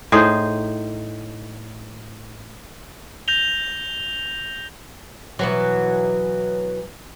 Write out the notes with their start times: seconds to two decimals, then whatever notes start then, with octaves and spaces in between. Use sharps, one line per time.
0.12 A2 D#4 G#4 C5
3.28 G6 A#6 F7 G7
5.39 B2 E3 F#3